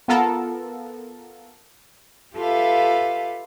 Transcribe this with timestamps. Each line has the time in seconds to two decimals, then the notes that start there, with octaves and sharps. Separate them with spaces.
0.08 B3 F4 A4 A#4
2.36 F4 G4 A4 B4 E5 F5